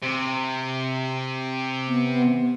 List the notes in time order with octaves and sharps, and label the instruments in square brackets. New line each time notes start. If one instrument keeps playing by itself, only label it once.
[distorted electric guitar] C3
[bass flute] B3